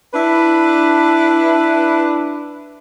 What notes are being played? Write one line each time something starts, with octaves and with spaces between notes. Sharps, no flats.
D4 E4 B4